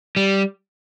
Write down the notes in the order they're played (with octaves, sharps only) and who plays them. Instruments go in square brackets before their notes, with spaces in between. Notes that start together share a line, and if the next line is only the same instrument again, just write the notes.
[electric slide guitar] G3